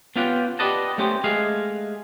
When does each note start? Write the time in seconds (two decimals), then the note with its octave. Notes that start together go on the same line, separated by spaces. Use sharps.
0.16 B3 C#4 F4 G4 F#5 G5
0.59 G4 B4 D5 D#5 F#5 A5
0.98 A3 B3 C#4 G4 C5
1.24 G#3 A3 G#4 D#5 F5